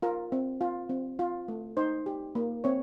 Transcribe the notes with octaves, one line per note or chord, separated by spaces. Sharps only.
F4 A#4
C4
F4
C4
F4
A3
D#4 C5
G4
A#3
C4 C#5